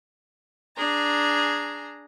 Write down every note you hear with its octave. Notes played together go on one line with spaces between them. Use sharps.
D4 G#4 A#5